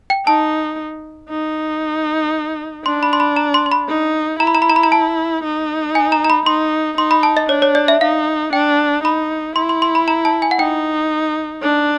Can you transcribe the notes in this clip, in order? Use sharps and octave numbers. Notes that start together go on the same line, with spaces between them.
G5
D#4 A5
D#4
D4 C6
B5
C6
B5
A#5
C6
C6
B5
D#4
E4 A#5
B5
A#5
B5
A#5
B5
A#5
A5
D#4
G#5
A#5
A#5
B5
D#4 C6
D#4 C6
B5
A5
D#5
D4 C#5
C#5
D5
E5
D#4 F5
D4 G5
D#4 B5
E4 C6
C6
C6
B5
A#5
A5
G#5
F#5
D#4 G5
D4